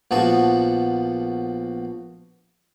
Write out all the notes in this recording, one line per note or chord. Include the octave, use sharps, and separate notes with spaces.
A#1 F3 B3 F#4 A5 C#6